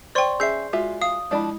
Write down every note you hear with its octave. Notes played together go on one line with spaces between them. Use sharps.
C5 D5 G5 C6 C#6
C#4 G#4 E5 G6 C7
G#3 F4 F#4 E5
F5 D#6
F3 G#3 D4 E4 D5